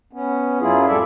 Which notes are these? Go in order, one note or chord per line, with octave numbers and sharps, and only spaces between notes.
B3 C#4
F#2 F#3 E4 F4 G#4
F2 A2 G3 A4 D5 E5